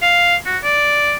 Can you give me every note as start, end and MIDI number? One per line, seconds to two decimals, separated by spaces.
0.02 0.36 77
0.46 0.58 66
0.64 1.16 74